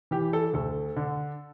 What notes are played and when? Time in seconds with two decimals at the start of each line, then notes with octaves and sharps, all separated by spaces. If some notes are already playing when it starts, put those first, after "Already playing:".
0.11 E3 G4
0.33 A4
0.53 D2 A4
0.96 D3